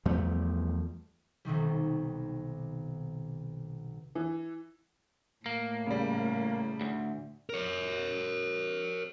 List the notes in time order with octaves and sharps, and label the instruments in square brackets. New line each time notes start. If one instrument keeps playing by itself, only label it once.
[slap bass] E2 F3 G3 A3
[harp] B1 C3 D#3 G3
[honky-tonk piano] E3
[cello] A2 [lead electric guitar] A#3
[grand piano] C#3 G3
[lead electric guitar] D2
[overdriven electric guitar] A#4 C#5